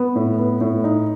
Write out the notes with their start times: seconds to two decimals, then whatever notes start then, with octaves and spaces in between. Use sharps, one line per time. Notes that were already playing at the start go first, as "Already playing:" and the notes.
Already playing: B3
0.15 A2
0.39 B3
0.61 A2
0.84 D#4